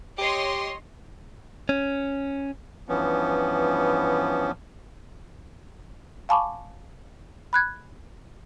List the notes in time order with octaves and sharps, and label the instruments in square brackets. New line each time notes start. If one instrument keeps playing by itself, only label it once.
[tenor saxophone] G4 [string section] C#5 D#5 C6
[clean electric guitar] C#4
[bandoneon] G2 E3 F3 B3 C#4
[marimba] F5 G#5 A5 B5 C#6 D6
B5 F#6 G#6